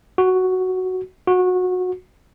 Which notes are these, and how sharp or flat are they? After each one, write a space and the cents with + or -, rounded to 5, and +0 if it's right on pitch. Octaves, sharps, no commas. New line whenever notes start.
F#4 +5
F#4 -20